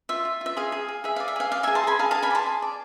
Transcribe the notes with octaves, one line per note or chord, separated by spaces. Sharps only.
F4 E5
F4
F4 E5
G#4 F5
G#4
G#4
G#4 E5
D5 F5
E5
G#4 F5
D5 F5
G#4 E5 G#5
A5 C6
G#4 G#5 B5
G#4 F5 A5
G#4 F5 A5
G#5 B5
D5
A5 C6
G#4
D5